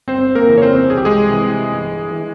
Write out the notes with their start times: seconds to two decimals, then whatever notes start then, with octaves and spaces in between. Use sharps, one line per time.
0.08 G1 C4 C5
0.35 A#3 A#4
0.48 F2 C#3 E3
0.58 C#5
0.62 C4 C5
0.90 C2 G#4
0.97 G4
1.05 G#3 G#4
1.30 C3 E3
1.72 G1
2.11 E3